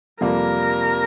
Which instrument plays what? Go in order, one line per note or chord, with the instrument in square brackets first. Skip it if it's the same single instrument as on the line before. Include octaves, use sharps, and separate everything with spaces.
[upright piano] F2 C3 G3 A#3 F4 [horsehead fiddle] A#4